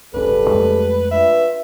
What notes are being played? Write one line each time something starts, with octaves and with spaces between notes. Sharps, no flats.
D1 G1 C#3 G3 C#4 A4 B4
F2 G#3 A3
D4 F4 B4 E5